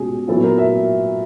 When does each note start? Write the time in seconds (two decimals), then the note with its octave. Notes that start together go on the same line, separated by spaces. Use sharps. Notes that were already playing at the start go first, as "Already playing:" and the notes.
Already playing: B2 G#3 C#4 F4 G4 G#4
0.28 A#2 F#3 B3 E4 A4
0.44 A#4
0.58 E5